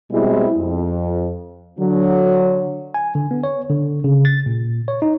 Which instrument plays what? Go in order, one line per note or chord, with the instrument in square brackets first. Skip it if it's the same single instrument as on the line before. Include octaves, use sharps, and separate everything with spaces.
[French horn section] B2 G3 G#3 C4 E4
F2
D3 F#3
[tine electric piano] G#5
D3
B3
C#5
D3
C#3
A6
A#2
C#5
D#4